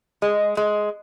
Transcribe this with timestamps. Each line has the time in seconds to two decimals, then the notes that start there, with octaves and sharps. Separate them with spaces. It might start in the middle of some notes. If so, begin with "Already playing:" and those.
0.22 G#3
0.57 G#3